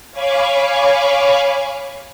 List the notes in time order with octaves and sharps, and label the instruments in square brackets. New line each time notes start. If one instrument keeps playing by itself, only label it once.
[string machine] C#5 F5 G#5 B5 C#6 D6